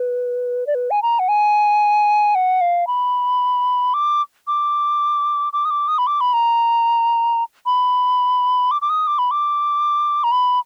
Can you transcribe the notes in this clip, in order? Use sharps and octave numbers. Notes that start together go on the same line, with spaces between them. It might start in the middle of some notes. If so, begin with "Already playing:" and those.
Already playing: B4
D5
B4
G#5
A#5
F#5
G#5
F#5
F5
B5
D6
D6
D6
D#6
D6
D#6
B5
D6
B5
A#5
B5
D6
D6
D#6
D6
B5
D6
A#5
B5